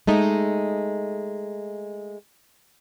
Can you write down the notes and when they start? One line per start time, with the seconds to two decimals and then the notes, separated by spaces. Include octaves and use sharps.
0.07 G#3 A3 D#4